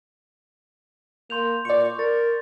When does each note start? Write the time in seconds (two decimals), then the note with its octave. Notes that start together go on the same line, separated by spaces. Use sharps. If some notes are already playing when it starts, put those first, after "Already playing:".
1.30 A#3 C6 G6 F7
1.65 A#2 D5 C#6
1.99 A#4 A6